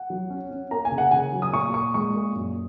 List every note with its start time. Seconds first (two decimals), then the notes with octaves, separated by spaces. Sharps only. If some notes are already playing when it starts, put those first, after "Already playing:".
Already playing: F#5
0.10 F#3
0.30 C#4
0.51 C#4
0.71 A#3 A#5
0.85 G#5
0.92 C#3
0.98 F#5
1.11 C#3 G#5
1.33 F#3
1.42 D#6
1.53 A#2 C#6
1.74 A#2 C#6
1.94 G#3 C#6
2.15 A#2
2.35 F#2